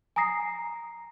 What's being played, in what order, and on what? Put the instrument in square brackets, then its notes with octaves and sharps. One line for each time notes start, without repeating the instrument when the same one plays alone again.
[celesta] G#5 A#5 D#6 A#6 C7